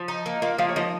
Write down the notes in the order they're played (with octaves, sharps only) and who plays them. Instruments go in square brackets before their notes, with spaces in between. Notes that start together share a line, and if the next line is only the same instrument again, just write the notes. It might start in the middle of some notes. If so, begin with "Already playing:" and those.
Already playing: [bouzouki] F3
D#4
A#3
[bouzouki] A#3 [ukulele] F4 F5
[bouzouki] F3 [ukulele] F4 F5
[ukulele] C#5
[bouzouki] F3 [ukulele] D#4 D#5